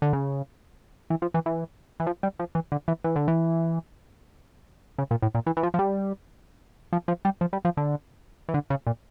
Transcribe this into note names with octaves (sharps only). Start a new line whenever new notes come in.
D3
C#3
E3
F3
E3
E3
E3
F3
G3
F3
E3
D3
E3
E3
D3
E3
C#3
A#2
A2
A#2
E3
E3
F3
F3
G3
F3
F3
G3
F3
G3
F3
D3
E3
D3
C#3
A#2